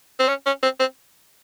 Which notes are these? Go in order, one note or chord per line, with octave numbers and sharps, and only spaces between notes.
C4
C#4
C#4
C4
C4